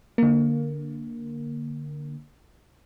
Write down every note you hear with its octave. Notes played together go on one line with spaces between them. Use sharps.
D3 A#3